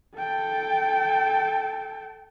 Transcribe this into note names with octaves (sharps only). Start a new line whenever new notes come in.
A4 G5